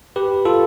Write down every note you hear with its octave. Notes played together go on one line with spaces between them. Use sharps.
G4 B4
F4 A4